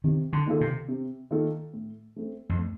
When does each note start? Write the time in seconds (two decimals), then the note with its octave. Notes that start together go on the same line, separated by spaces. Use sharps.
0.04 C3 D#3
0.33 D3
0.46 D#3 A#3 F4 A4
0.61 C3
0.88 C3
1.31 D#3 A#3 F4 A4
1.74 A2
2.16 A3 C4
2.49 F2
2.59 A2